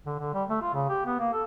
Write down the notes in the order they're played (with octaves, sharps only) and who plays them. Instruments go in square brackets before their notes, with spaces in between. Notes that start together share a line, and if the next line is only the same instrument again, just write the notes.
[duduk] D3
D3
G3
A3
F4
C#3
G4
B3
A#3
A4